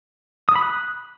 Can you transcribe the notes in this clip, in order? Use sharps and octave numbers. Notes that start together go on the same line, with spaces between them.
D#6
B5
F#6